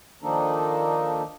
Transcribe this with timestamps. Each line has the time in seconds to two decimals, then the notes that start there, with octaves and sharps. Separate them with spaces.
0.23 D#3 F3 A#3 D4 D#4 A4